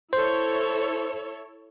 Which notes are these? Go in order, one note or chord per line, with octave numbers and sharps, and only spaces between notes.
E4 A4 C5 C#5